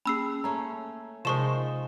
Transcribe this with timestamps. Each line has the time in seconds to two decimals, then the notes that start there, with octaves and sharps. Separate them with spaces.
0.06 A#3 C#4 G#4 B5 E6 C7
0.44 A3 C#4 A#5
1.25 C3 F3 G#3 D#4 C5 C#6 E7